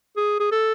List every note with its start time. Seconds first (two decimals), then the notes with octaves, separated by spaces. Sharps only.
0.17 G#4
0.40 G#4
0.52 A4